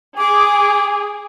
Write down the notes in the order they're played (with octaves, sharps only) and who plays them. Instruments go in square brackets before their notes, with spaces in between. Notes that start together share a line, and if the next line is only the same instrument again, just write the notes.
[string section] G#4 [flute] D6